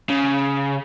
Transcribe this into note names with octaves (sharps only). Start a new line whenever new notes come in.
C#3